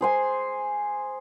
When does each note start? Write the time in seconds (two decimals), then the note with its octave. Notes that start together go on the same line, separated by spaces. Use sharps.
0.01 G#4 C5 G#5